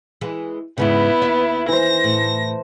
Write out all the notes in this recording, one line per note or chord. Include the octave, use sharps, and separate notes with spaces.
E3 G#3
E2 G#2 C#3 B3 E4
D#2 B4 E5
E3 C5 A#6
A2